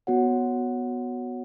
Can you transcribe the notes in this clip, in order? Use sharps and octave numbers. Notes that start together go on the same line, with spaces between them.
B3 F#4 C#5 F#5